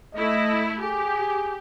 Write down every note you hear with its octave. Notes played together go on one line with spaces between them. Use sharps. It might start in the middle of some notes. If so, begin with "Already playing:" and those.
A3 E4 D#5
G4 G#4